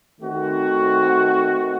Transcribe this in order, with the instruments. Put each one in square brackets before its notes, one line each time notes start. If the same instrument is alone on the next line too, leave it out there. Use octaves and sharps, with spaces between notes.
[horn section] D#3 A3 C4 F#4